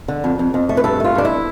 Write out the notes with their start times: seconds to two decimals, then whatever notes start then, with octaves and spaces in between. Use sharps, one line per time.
0.08 D3
0.24 F2
0.39 F2
0.54 F2
0.69 A3
0.77 B4
0.84 G2 A4
1.00 A3 F4
1.15 G2 D4
1.25 E4